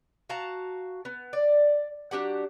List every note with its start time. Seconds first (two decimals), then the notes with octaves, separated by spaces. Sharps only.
0.30 F#4 F5 A5 A#5
1.05 B3
1.33 D5
2.11 F#3 D4 G4 F#5